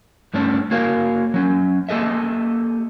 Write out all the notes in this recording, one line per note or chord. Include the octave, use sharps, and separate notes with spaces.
G2 A3 C#4 D4
A#3 F#4 A#4 C#5 F5
F#3 C#4
A#3 G4 A4 D#5 E5